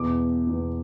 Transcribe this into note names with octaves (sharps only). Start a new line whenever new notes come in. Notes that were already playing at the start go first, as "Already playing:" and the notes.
Already playing: E2 B2 D6
E2 B2